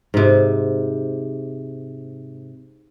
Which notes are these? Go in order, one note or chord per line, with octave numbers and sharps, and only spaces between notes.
G#2 C3